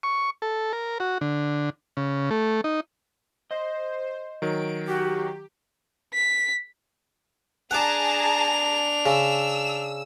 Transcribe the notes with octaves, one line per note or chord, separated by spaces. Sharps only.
C#6
A4
A#4
F#4
D3
C#3
A3
D#4
C5 D#5
D#3 F#3 D7
F#4 G4
B6
D4 G#4 F#5 A5 A#5 D6 F7
C#3 E6